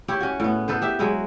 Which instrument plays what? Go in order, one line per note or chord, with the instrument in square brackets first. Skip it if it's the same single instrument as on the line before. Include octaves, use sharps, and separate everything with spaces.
[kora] E4 G4 C#5
C#4 F#4
A2 B3
B3 A4 B4 C5
G4 E5
F#3 G#3 E4